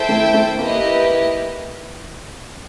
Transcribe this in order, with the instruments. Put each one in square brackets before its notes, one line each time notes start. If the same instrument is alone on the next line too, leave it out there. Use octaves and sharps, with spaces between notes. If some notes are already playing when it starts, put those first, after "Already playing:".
Already playing: [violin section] E4 A4 C5 E5 G5
[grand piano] A3
A3
[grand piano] A#3 [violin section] E4 G4 B4 D#5